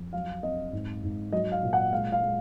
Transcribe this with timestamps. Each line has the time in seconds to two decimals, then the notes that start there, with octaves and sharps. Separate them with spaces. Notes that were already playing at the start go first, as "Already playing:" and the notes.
Already playing: F2
0.13 F#3 F5
0.43 C4 D#5
0.73 G#2
1.03 G#2
1.32 F#3 D#5
1.52 F5
1.63 A#2
1.73 F#5
1.92 G#3 F5
2.12 F5
2.22 G#3